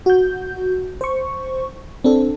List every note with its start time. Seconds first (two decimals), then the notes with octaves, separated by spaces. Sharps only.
0.06 F#4 G6
1.01 C5 C#6
2.04 C4 D4 A4